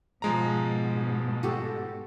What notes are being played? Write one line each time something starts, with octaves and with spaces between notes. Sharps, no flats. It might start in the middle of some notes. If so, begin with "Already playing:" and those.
G#2 B2 F3 G#3 A#5
F#4 G4 A4